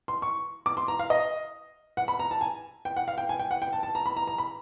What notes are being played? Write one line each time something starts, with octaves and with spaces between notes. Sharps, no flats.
C6
C#6
D6
C6
A#5
F5
D#5
F#5
B5
A#5
A5
G#5
G5
F#5
F5
G5
G#5
G5
F#5
G5
A5
A5
A#5
B5
A#5
A#5
B5